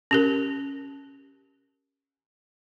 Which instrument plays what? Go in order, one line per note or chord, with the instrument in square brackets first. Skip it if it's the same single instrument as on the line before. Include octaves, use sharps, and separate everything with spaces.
[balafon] C#4 G4 A#4